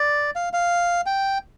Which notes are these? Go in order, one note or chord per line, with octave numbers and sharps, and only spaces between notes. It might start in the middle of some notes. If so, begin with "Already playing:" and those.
Already playing: D5
F5
F5
G5